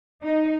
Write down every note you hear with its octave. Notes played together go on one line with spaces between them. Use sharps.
D#4